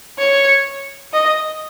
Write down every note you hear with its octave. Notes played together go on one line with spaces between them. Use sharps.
C#5
D#5